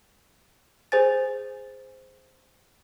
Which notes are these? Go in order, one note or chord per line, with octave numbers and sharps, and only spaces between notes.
G#4 C5 G#5 A6